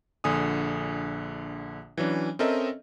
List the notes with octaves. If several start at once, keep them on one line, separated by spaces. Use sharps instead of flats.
A#1 D3 G#5 D#6
E3 F#3 C#4 D4
C4 C#4 A4 A#4 D#5 E5